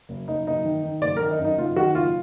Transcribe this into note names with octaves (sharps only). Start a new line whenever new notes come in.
F#1
F#1 D#4
F#1 D#4
D#3
D#3
F#1 D5
D#3 A#4
D#4
F#2
D#4
F#1 F4
D#3 F#4
F#1 F4